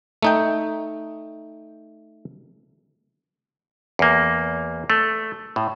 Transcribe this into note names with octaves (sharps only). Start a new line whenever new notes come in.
A3 D#4 G5
E2 A#3
A3
A2